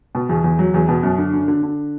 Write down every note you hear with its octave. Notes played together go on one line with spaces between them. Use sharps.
B2
E2
E2
F#3
E2
B2
F#2
D3
D3
D3
D3